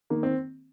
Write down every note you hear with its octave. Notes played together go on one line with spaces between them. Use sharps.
D#3 A#3
C4